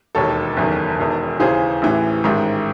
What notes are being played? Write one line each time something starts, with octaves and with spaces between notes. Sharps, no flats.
E1 D#2 D#3 A4 C#5
F#1 E2 D#3
E1 E2 D#3
D#2 C#3 E3 G#4 C5
A1 A2 E3
A1 G#2 D#3